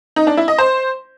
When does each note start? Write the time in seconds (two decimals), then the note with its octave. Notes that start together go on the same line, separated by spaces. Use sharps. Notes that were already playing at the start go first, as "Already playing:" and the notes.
0.16 D#4
0.27 D4
0.37 E4
0.48 D#5
0.58 C5